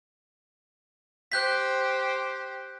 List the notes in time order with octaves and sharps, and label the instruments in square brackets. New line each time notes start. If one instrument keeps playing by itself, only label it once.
[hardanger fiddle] G4 C5 [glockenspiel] F#6 G6 B6